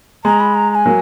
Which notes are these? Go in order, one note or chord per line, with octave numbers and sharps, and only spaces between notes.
G#3 A#5
B5
A#5
A#5
G#5
F#3 A#3